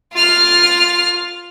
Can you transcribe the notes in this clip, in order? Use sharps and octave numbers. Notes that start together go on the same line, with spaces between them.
F4 F6